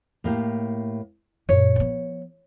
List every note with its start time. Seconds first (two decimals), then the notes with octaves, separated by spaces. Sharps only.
0.24 A2 A#3 G4
1.49 F#2 A#2 C#5
1.76 F3 B3